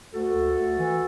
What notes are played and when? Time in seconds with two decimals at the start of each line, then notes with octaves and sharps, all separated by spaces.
0.13 D2 F#4 A4
0.35 D2
0.57 D2
0.79 E3